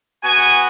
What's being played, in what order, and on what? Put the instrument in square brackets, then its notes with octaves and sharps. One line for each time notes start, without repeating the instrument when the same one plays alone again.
[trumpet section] B3 F#4 G#5